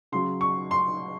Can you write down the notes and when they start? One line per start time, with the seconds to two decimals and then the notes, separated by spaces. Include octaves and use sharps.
0.12 C#3 F#3 C6
0.41 C#6
0.71 C6